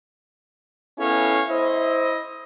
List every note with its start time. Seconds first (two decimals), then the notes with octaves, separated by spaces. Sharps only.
0.99 B3 C#4 E4 A4 C#5 F5
1.50 E4 C5 D#5